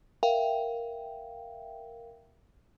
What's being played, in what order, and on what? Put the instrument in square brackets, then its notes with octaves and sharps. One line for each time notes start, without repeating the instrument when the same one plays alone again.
[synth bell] A#4 E5 F5 G5